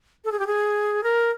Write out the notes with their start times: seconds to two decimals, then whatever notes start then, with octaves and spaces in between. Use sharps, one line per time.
0.25 A4
0.32 G#4
0.40 G4
0.47 G#4
1.03 A#4